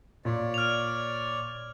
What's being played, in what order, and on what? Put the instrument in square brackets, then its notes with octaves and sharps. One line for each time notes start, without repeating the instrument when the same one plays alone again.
[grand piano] A#2 [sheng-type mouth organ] C#5 D5
[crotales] F6 F7